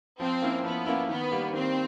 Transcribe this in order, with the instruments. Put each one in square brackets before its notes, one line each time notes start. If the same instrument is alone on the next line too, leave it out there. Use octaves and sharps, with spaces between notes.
[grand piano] F3 [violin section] C4
[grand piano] A#3 C#4 E4
[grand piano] F3 [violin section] B3
[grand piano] A#3 C#4 E4
[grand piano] D#3 [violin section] B3
[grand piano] G3 A#3
[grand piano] D#3 [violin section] C4